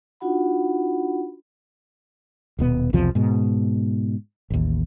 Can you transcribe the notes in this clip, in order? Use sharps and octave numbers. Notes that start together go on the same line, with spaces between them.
D4 D#4 F4 F#4 F#5 B5
D#1 B2 B3
B1 E2 C3 F3
G#2 B2
A1 D#2